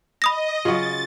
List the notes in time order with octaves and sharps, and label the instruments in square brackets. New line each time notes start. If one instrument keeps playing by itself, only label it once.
[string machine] D#5 [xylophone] B5 D#6 A#6
[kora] C#3 F#3 [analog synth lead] F4 [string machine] A6